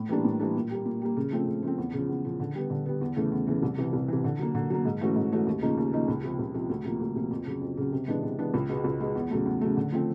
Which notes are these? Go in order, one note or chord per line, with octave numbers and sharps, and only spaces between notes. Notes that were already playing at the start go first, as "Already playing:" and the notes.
Already playing: A2
E3 G3 A#3 D4
A2
E3 G3 A#3 D4
A#2
G3 A#3
A#2
G3 A#3
C#3
F3 A3 C4
C#3
F3 A3 C4
E2
C#3 F3
E2
C#3 F3
D3
G3 B3
D3
G3 B3
E2
C#3 E3 A3
E2
C#3 E3 A3
C2
C3 E3
C2
C3 E3
D3
F#3 A#3
D3
F#3 A#3
G#2
E3 A3 C#4 F#4
G#2
E3 A3 C#4 F#4
D#2
C#3 F3 A#3 D#4
D#2
C#3 F3 A#3 D#4
C#2
C3 F3
C#2
C3 F3
D2
C3 F3 A#3
D2
C3 F3 A#3
F2
C#3 F#3
F2
C#3 F#3
C3
E3 G#3 B3 D4
C3
E3 G#3 B3 D4
C#2
B2 G#3 B3
C#2
B2 G#3 B3
E2
C#3 F#3 A3
E2
C#3 F#3 A3
D3
F3 A3 C4